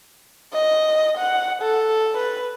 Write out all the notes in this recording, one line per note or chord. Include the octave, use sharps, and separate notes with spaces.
D#5
F#5
A4
B4